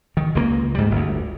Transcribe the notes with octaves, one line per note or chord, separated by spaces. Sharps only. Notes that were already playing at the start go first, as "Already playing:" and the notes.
D#3
C#2 G3 A#3
G#2 G3
G1 D2